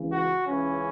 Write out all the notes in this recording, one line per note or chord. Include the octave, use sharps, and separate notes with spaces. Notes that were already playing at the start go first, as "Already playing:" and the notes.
Already playing: C#2 C#3 E3
F#4
C#2 C#3 E3 C#4